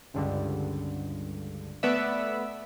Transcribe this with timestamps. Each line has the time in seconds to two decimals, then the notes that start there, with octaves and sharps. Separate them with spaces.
0.14 C#2 G2 D3
1.83 A3 B3 B4 D5 E5